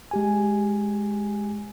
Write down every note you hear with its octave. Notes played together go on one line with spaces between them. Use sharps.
G#3 G4 G#5